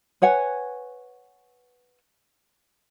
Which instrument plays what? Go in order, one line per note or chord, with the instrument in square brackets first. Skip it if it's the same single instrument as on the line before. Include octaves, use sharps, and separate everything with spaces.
[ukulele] B4 C#5 F#5 G#5